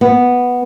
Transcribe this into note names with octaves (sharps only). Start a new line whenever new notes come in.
B3